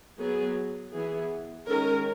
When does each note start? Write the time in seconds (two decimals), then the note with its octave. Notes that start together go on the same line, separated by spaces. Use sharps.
0.19 F#3 B3 G#4
0.93 E3 B3 G#4
1.68 D#3 G#3 C#4 A#4